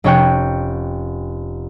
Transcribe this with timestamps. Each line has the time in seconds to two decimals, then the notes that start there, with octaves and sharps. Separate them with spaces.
0.04 F1 C#4 C#5 G5 F#6